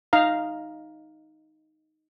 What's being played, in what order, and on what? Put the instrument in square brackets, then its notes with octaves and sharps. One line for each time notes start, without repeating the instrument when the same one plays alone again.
[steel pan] D#4 F5 A#5